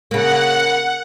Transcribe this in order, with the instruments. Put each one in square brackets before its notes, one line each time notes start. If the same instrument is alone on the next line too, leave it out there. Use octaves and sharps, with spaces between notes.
[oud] C#3 A#3 [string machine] F#5